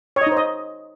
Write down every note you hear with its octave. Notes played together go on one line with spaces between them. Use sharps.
C#5
D#5
D#4
C5
D#5